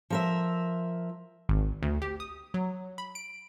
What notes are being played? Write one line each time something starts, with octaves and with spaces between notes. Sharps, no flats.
F3 A#4 E5
G#1
D2
G4
D#6
F#3
B5
D7